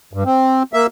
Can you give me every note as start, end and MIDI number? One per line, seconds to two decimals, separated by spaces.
0.13 0.24 43
0.25 0.63 60
0.73 0.87 58
0.73 0.87 76